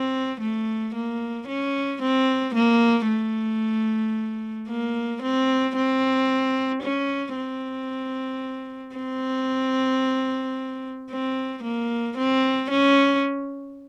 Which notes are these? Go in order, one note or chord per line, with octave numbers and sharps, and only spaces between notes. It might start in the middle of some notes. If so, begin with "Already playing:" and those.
Already playing: C4
A3
A#3
C#4
C4
A#3
A3
A#3
C4
C4
C#4
C4
C4
C4
A#3
C4
C#4